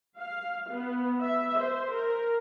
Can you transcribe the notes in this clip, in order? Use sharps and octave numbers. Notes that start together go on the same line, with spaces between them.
F5
B3
E5
C5
A#4